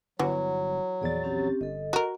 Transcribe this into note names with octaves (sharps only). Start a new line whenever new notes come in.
G1 E3 F#3 F#4
A#1 E2 G#4 D5 A6
C4 C#4 G4
G1 A4 D#5
F#4 A#4